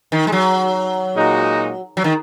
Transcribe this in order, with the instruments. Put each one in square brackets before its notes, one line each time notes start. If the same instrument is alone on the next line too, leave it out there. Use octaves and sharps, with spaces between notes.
[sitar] D#3
G#3
F#3
[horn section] A#2 G#3 D#4 F#4
[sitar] F#3
D#3